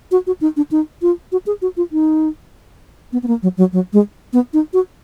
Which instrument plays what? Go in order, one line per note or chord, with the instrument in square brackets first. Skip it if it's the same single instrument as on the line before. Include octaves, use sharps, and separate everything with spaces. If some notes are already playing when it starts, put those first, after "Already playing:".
[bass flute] F#4
F#4
D#4
D4
D#4
F4
F#4
G#4
F#4
F4
D#4
B3
B3
A#3
F#3
F#3
F#3
G#3
B3
D#4
F#4